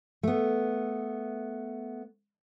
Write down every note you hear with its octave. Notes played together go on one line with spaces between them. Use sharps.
A3 B3